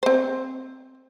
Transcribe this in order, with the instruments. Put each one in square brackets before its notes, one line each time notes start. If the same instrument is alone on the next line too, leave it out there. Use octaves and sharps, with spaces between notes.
[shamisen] C4 C5